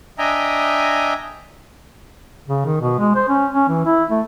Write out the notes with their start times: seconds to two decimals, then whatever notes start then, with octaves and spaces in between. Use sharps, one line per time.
0.18 D4 D#5 E5 G5 G#5 A#5
2.47 C#3
2.65 D#3
2.81 B2
2.99 G#3
3.16 C5
3.28 C#4
3.53 C#4
3.69 E3
3.86 E4
4.10 A3